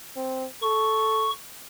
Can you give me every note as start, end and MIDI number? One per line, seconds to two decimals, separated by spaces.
0.16 0.46 60
0.62 1.29 69
0.62 1.31 85